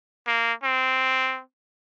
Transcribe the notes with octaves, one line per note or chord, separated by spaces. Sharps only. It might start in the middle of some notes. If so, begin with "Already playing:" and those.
A#3
C4